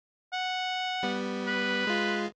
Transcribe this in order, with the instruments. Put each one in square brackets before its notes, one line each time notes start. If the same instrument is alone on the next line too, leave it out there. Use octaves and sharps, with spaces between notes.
[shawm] F#5
[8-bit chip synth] G3 B3
[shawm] B4
[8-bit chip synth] G#3 F4